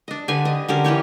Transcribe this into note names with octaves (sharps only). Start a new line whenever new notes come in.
D4 D#5
D3 G4 B4 G#5
D#5
D3 C#4 G4 A#4
E3 C#4 G4 C#5